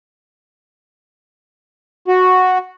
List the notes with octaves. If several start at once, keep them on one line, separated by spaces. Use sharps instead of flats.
F#4